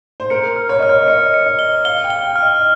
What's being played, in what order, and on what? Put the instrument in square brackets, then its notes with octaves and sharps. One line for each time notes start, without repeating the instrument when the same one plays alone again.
[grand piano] C5
[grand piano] A#4 [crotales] C#7
[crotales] F6
[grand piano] C#5
[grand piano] D#5 [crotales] F6
[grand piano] C#5
[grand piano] D#5 [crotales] C#7
[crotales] C#7
[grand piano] D#5
[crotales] G7
[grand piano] F5 [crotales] G7
[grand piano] G5
[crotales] G7
[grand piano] G5
[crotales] F6
[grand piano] D#5